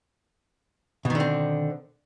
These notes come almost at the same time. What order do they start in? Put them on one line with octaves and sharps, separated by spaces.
B2 D#3 D3 C4